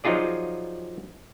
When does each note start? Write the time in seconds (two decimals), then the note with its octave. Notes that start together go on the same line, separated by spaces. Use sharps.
0.04 F3 F#3 D#4 F4 G#4 D5